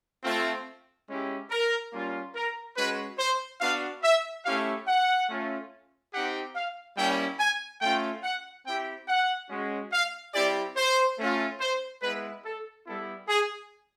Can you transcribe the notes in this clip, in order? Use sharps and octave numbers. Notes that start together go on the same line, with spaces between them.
A3 C4 F4
G#3 C#4 E4 G4
A#4
G3 A#3 C#4 F4
A#4
G#3 C#4 F#4 B4
C5
B3 D4 F#4 F5
E5
A3 C#4 E4 G4 F5
F#5
A3 C#4 F4
C4 D#4 G4 F#5
F5
G3 A#3 C#4 E4 G4 G5
G#5
A3 C#4 F4 G5
F#5
C4 E4 G4 G5
F#5
G#3 C#4 F#4
F5
G3 C4 E4 G4 D5
C5
A3 C#4 F4
C5
G#3 B3 E4 B4
A4
G3 B3 E4 A4
G#4